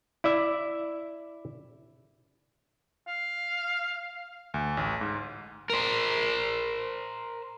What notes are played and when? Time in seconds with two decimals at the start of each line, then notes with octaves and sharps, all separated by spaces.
0.24 E4 D5 E5
3.07 F5
4.54 D2
4.77 A1
5.01 G#2
5.70 A#4 C5